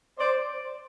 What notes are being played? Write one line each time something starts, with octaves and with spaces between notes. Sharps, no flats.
C5 D5